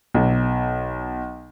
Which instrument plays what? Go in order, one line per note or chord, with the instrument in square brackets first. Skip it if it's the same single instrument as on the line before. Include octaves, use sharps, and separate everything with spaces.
[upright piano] B1